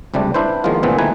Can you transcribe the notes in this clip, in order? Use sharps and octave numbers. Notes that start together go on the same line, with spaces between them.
C#2 C3 G3 A3 D4
D4 E4 B4 C5
D#3 F3 G#3 A#3 B3 F4
C#2 A#2 E3 A3 B3 C4
D#3 F3 A3 A#3 B4 G#5